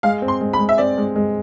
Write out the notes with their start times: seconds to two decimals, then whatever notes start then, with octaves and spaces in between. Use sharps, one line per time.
0.03 G#3 F5
0.22 C4
0.28 C6
0.41 G#3
0.53 B5
0.59 G#3
0.69 E5
0.78 C4 D5
0.98 G#3
1.16 G#3